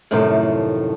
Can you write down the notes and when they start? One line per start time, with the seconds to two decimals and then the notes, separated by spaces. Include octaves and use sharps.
0.11 F#2 A2 C3 D#3 F3 A3